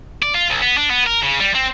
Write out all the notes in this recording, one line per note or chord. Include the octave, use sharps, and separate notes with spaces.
D5
F4
B1
B3
D4
B3
A#4
C#3
G3
C4